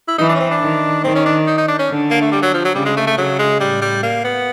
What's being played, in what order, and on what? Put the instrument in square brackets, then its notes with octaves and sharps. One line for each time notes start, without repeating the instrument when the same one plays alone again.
[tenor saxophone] E4
[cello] E3 [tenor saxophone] D#4
[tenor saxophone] D4
C#4
C4
D4
[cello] D#3
[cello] D#3 [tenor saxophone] C4
[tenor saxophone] C#4
D4
D#4
D#4
D4
C#4
[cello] D3
[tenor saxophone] A#3
A3
G3
F#3
F3
F#3
[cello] C#3 [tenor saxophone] G3
[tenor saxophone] G#3
A3
A3
[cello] C#3 [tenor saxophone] F#3
[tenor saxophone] G#3
[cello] A2 [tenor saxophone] G3
[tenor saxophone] G3
A#3
B3